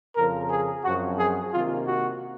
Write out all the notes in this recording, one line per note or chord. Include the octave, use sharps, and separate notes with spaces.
F2 C#3 F3 A#4
G#4
F#2 F3 C4 F#4
G#4
C3 D#3 A#3 F4
F#4